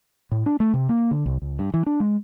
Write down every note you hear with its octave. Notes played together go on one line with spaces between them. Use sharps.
A2
D4
A3
C3
A#3
D3
C2
C#2
G2
E3
D4
G#3